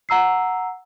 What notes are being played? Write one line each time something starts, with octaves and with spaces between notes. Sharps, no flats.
F#5 A#5 E6 C7